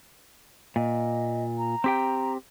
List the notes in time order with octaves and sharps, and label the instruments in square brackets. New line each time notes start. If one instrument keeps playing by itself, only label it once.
[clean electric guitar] A#2 [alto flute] D#5
[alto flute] A#5
[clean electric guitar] C4 G4 G5